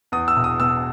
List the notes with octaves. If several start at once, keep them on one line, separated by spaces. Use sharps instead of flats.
E2 D#6
E6
E1
D#6
B2 E6